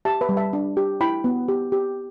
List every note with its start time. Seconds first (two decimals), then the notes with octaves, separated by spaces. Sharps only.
0.05 G4 E5 A5
0.21 B4 E5
0.29 G3
0.37 E5 A5
0.53 D4
0.77 G4
1.01 E4 G5 B5
1.24 B3
1.48 G4
1.72 G4